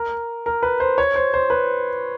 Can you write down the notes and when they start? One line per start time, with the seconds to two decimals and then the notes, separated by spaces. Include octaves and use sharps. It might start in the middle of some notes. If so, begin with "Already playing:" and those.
Already playing: A#4
0.46 A#4
0.63 B4
0.80 C5
0.98 C#5
1.16 C5
1.34 C5
1.50 B4